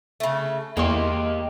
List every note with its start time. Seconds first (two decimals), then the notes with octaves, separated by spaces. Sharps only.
0.20 C#3 A3
0.77 E2 G#3 A#3 G4 C6